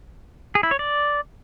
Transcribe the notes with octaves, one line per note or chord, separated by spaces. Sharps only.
G#4
E4
C#5
D5